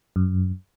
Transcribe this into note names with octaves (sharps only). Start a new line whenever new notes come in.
F#2